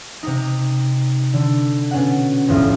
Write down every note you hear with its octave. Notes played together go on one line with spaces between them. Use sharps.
C3 D#4
D3
B2 C#4 F#5
D#1 B1 F2 A2 F4